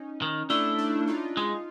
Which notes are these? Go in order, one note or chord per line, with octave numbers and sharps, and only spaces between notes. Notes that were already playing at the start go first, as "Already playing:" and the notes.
Already playing: C#4 D#4
D#3
A3 D4 E4
D4 E4
D#4 F4
G#3 D#4 F4